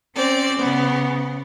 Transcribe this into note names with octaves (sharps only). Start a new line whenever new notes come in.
C4 C#4 C5 D5
C#3 B3